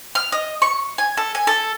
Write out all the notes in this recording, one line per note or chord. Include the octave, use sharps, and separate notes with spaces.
F6
D#5
C#6
G#5
A4
G#5
A4